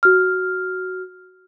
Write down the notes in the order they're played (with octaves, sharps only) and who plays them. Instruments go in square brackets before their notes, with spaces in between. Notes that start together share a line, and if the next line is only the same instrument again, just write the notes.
[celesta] F#4 F6